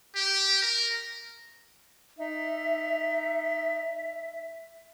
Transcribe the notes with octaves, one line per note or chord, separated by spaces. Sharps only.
G4
A#4
D#4 E5